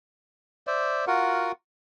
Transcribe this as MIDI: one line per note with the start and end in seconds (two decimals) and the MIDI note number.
0.67 1.05 72
0.67 1.05 74
0.67 1.05 76
1.07 1.52 65
1.07 1.52 66
1.07 1.52 70
1.07 1.52 78